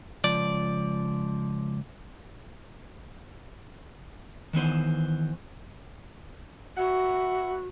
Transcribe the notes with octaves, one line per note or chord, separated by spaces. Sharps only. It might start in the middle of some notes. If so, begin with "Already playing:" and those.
C#2 F3 D5
D#3 E3 B3 C5
F#4 B4 E5 F#5